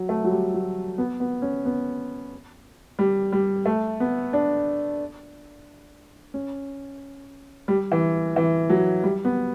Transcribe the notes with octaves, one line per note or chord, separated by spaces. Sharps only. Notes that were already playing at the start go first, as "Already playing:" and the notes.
Already playing: F#3
A3
F#3
G3
F#3
B3
B3
C#4
B3
G3
G3
A3
B3
D4
C#4
G3
E3
E3
F#3
G3
B3